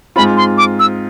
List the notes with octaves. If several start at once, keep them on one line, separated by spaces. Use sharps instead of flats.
G#2 G#3 C4 F4 B5
C6
D6
E6